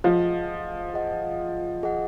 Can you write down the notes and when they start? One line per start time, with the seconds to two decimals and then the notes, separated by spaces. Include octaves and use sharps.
0.04 F3 G#4 D#5 F#5
0.94 G#4 D#5 F#5
1.83 G#4 D#5 F#5